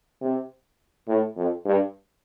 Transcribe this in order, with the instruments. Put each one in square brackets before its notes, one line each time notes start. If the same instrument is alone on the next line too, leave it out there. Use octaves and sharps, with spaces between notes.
[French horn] C3
A2
F2
G2